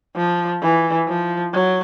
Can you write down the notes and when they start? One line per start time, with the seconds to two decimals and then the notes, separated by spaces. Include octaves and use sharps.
0.16 F3
0.62 E3
1.08 F3
1.53 F#3